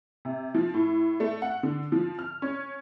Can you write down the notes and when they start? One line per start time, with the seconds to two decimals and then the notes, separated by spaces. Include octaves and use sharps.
0.25 C3
0.54 F3
0.74 A2
1.20 A3
1.42 F#5
1.63 D3
1.92 F3
2.19 F6
2.42 C#4